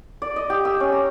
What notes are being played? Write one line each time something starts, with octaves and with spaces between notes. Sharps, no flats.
D5
D#5
G4
E6
C#4
A#5